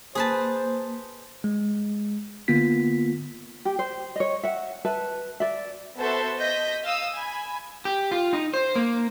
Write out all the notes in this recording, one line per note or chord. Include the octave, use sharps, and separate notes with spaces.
A#3 G#4 B4 C5 A5
G#3
D3 A#3 B3 F4 B6
G4
C5
C#5 D#5
E5 F#5
B4 E5 A5
D5 E5
B3 F#4 A4 C5 E5 A5
D#5 G6 A#6 B6
F5 D#6 E6
G#5 B5
G4
F4
D#4
C5
A#3